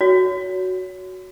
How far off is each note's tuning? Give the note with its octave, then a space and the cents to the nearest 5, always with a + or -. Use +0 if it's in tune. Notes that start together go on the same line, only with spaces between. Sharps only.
F#4 +0 C#5 +25